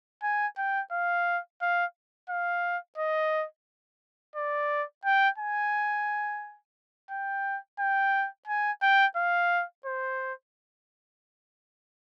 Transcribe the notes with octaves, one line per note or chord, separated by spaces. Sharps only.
G#5
G5
F5
F5
F5
D#5
D5
G5
G#5
G5
G5
G#5
G5
F5
C5